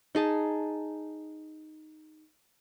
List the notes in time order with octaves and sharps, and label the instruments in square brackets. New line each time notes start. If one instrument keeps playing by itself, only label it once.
[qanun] D#4 G#4 A5